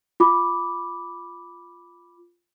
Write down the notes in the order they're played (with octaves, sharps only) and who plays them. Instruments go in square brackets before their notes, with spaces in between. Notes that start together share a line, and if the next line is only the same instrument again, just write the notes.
[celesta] F4 B5 D6